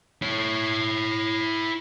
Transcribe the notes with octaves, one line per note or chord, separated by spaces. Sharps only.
E4 C#5